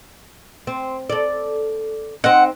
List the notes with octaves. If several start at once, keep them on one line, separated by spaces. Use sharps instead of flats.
C4
A4 D5
C4 D#4 F#5